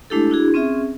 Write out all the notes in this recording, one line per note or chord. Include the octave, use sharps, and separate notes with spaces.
G#3 A3 D4 E4 G4 A4
D4 E4 F#4 G#4
C4 C#4 F4 G#4 E5